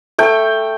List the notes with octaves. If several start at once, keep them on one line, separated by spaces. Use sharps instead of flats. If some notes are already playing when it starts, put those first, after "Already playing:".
A3 G5